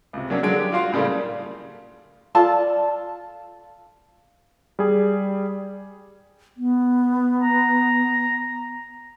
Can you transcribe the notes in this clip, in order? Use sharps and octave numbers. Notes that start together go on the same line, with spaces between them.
C#2 C3
F#3 A#3 C#4 D4
D3 F#3 G#3 D7
G4
F4 F#4 F5 C6
A2 C#3 G3 A3 A#3
F4 A4 D5 A5
G3 G#4
B3
A#5